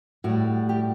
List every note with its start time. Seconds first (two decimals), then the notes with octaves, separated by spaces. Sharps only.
0.24 A2 G3 F#4
0.69 G4